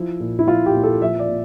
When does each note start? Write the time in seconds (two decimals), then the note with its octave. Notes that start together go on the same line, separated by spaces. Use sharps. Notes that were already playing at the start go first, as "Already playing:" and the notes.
Already playing: F3 E4
0.20 A#2
0.39 E4
0.47 F3 F4
0.66 G4
0.74 A#2
0.84 A4
1.01 F3 E5
1.19 D5
1.29 A#2